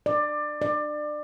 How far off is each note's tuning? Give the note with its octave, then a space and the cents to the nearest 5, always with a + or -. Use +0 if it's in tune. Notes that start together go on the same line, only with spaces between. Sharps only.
D5 +20
D5 +25